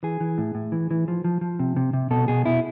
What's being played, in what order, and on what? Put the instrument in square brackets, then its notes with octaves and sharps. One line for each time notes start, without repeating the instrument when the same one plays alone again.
[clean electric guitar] E3 G#4
E3
A2
A2
E3
E3
F3
F3
F3
C3
C3
C3
B2 A4
B2 G#4
B2 E4